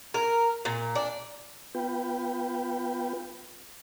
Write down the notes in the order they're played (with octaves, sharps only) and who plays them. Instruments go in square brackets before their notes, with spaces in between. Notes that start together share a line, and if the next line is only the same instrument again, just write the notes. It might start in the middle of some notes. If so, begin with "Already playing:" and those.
[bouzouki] A#4
A#2
D4
[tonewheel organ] B3 F4 B4 G5